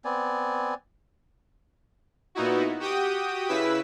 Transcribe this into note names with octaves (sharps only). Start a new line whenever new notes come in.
B3 C4 D5 G#5
A#2 B3 D#4 E4 F#4
F#4 G4 G5 D#6
C#3 E4 B4 E6 B6